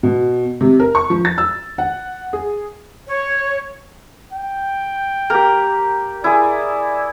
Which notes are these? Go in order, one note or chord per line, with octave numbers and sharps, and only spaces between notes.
B2
C3
A#4
C#6
F3
A6
E6
F#5
G#4
C#5
G5
A#3 G4 A#4
E4 G#4 D5